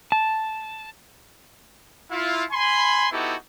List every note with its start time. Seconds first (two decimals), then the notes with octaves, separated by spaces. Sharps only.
0.12 A5
2.11 E4 F4 F5
2.51 G#5 B5 C6
3.12 B3 D#4 E4 F#4 G4 A4